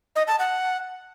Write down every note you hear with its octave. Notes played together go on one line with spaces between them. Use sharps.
D#5
A5
F#5